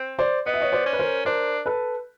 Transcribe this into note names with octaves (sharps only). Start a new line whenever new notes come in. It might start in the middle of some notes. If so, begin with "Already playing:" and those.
Already playing: C4
C5 D5
B3 D#5
E5
C#5 D#5
C5 D5
C#4
B4
A#4 C5
D4 A#4 C5
A4 B4